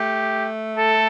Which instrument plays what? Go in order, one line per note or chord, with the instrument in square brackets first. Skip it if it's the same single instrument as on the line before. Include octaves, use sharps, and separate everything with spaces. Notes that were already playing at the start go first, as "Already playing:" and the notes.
Already playing: [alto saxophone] A3 [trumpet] G4
[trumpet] A4